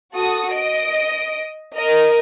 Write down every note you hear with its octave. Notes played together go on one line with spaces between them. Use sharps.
F#4 A4 D#6
D#5 D7
A#4 D#5